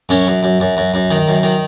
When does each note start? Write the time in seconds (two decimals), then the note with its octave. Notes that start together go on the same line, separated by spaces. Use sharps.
0.09 F#2 C#4
0.27 F#2
0.43 F#2
0.60 F#2
0.77 F#2
0.94 F#2
1.11 D#3
1.28 F#2
1.43 D#3